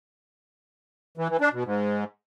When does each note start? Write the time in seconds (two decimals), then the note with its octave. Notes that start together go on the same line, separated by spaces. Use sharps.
1.17 E3
1.29 E3
1.41 D4
1.53 B2
1.64 G#2